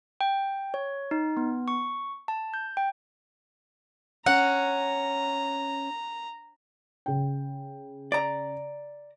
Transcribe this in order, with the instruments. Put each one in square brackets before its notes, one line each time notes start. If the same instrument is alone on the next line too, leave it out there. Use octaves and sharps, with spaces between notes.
[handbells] G5
C#5
D#4
B3
C#6
A5
G6
G5
[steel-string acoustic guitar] C#4 [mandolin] F#5 [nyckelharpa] A#5
[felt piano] C#3 G5
[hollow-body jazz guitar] D5 A#5